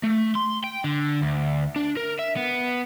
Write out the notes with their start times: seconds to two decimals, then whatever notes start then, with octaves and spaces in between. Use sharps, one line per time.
0.03 A3
0.35 C6
0.64 G5
0.84 D3
1.22 D2
1.76 D4
1.97 A#4
2.19 E5
2.37 B3